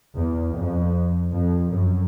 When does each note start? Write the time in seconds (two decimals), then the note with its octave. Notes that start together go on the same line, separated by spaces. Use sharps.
0.15 E2
0.54 F2
1.31 F2
1.70 F#2